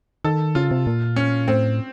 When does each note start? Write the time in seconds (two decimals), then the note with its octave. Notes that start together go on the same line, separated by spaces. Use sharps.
0.25 D#3 A4
0.55 C#3 F4
0.71 C3
0.87 A#2
1.16 C#4
1.48 A2 C4